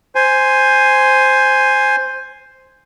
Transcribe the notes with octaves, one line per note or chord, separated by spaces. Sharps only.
C5 G#5